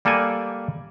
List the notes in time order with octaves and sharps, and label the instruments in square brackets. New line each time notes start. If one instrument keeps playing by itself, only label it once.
[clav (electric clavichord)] G3 A#3 A4 D5 G#5